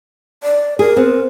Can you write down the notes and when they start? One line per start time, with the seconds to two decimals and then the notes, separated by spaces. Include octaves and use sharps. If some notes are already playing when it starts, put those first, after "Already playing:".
0.43 D5
0.79 G#4 A#4
0.96 B3 C4